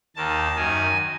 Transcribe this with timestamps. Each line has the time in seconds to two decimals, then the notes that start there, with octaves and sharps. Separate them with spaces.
0.16 D#2 D#3 A5
0.55 F#2 D#3 G#5